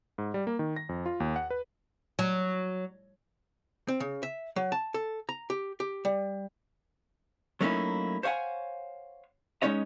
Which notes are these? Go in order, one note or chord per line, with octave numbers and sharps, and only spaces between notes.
G#2
G3
A#3
D#3
A#6
F2
F4
D#2
F#5
B4
F#3
C4
C#3
E5
F#3
A5
A4
A#5
G4
G4
G3
F#3 A3 A#3 C#4 D#4 E4
C5 C#5 F5 F#5 G#5
G#3 C#4 D#4 C#5 D#5